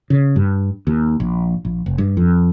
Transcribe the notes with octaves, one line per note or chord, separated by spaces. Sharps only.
C#3
G2
D#2
A#1
A#1
F1
G2
F2